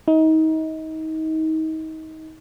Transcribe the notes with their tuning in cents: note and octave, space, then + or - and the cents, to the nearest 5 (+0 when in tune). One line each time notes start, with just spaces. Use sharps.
D#4 +30